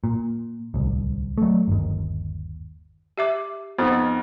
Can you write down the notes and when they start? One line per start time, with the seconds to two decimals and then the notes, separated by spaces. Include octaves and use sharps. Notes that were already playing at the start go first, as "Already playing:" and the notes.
0.04 A#2
0.74 D1 C2
1.38 F#3 A3
1.68 G1 D#2
3.18 G4 E5 D6
3.78 F2 B3 D#4 C5